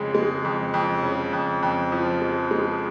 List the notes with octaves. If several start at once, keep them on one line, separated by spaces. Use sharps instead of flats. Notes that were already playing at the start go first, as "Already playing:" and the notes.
Already playing: F2 C#3 G#3
G#3
F2
F2
C#3
F2
F2
F3
G#3
G#3